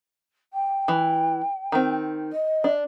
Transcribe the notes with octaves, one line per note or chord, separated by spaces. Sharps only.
G5
E3
D#3 C4
D#5
D4